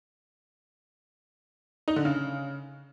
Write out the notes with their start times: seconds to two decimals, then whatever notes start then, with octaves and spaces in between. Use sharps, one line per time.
1.88 D#4
1.96 D3
2.05 C#3